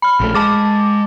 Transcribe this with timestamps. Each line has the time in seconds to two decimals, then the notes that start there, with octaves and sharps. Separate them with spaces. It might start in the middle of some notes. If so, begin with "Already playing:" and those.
0.02 B5 F6
0.20 A#1 A3
0.34 G#3 A5 D6 A6